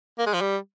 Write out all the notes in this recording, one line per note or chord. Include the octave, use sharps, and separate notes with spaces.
A#3
G#3
F3
G3